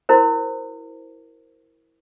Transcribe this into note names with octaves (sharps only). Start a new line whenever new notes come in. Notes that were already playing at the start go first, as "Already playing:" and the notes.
E4 F#4 A#4 C5